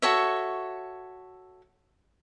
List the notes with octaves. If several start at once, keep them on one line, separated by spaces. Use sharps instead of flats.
F#4 A4 C#5 E5